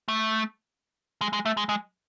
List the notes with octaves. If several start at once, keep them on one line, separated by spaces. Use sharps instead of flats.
A3
G#3
G#3
A3
G#3
G#3